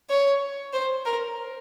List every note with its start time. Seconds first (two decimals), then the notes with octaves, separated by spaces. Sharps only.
0.10 C#5
0.73 C5
1.05 A#4